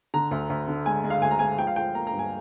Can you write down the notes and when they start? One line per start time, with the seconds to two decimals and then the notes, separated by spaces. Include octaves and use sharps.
0.14 D3 A#5
0.31 D2
0.50 D2
0.68 D3
0.86 G#3 G#5
1.04 G#3
1.10 F5
1.22 D2 G#5
1.31 A#5
1.39 G#3 G#5
1.59 F3 G5
1.67 F5
1.76 F3 G5
1.95 A#3 A#5
2.07 A#5
2.13 G2
2.19 G#5